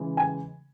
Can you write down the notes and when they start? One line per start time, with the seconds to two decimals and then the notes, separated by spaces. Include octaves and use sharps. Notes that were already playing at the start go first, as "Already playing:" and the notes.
Already playing: C#3 E3 G#3
0.17 G#5